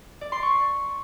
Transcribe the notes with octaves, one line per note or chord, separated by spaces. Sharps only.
D5
C6
C#6